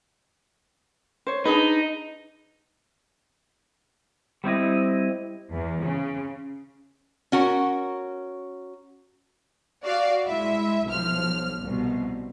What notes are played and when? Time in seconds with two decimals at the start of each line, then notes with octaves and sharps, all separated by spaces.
1.27 C5 C#5
1.45 D4 D#4 G#4 B4
4.44 G3 C4 E4 D#5
5.51 E2
5.83 C#3
7.32 C#4 F#4 A#4
9.83 F#4 D5 F5
10.25 G#3 E4 E5
10.86 B1 F3 F6
11.61 C2 B2